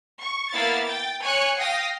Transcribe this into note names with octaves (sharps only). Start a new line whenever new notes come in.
C#6
A#3 B3 E4 F5 A6
G5 A6
C#5 G#5 C#6 F#6 C#7
F5 G5 D#6 A#6